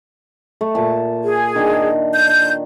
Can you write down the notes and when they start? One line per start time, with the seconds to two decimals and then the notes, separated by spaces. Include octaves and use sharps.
0.61 A3
0.75 A#2 A5
1.24 G#4
1.55 D#3 D4
2.14 G6